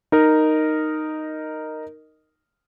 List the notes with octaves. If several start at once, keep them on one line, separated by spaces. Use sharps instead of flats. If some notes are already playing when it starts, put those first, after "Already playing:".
D#4 A#4 D#5